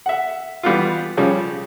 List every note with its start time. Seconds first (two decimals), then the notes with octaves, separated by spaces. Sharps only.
0.06 E5 F#5
0.63 E3 G3 B3 F4
1.17 C#3 F3 G3 C#5